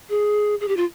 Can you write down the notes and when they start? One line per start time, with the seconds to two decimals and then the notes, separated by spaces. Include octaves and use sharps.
0.09 G#4
0.61 G#4
0.68 G4
0.77 F4